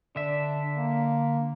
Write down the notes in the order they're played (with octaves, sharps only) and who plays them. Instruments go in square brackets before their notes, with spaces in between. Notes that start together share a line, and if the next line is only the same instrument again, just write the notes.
[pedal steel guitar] D3 E5 [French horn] D4
[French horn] A#3